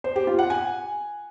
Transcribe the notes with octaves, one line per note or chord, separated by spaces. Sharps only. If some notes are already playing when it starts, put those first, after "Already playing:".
C5
G4
F4
F#5
G#5